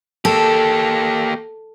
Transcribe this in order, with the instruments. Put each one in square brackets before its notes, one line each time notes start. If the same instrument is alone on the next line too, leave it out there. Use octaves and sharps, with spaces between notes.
[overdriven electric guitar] A#3 G4 [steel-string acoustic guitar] A4